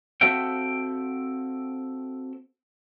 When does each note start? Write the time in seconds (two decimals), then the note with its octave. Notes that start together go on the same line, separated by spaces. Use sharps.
0.21 C4 F#4 A4 E5 F5 G5